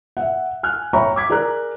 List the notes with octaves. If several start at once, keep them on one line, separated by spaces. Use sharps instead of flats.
E5 F#5
G#5 F6 F#6
C#5 E5 G5 A#5 B5 C#6
D6 G#6 B6
G#4 A#4 D5 A#5 F#6